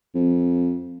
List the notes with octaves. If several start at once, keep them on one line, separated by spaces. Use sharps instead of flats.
F2